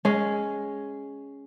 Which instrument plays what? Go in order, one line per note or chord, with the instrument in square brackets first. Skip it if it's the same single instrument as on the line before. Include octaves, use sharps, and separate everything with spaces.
[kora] G#3 C#4